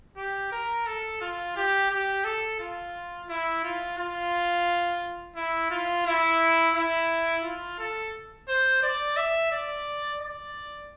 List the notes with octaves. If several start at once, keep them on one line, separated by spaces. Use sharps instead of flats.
G4
A#4
A4
F4
G4
G4
A4
F4
E4
F4
F4
E4
F4
E4
E4
F4
A4
C5
D5
E5
D5
D5